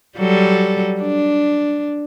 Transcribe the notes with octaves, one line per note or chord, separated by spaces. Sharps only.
F#3 G3 A4
D4